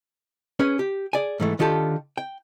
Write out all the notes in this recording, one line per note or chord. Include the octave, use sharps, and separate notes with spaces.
C#4 G#4 B4
G4
G#4 D5 G#5
G#2 E3 A3
D3 D#3 F4 G4 A4 A5
G5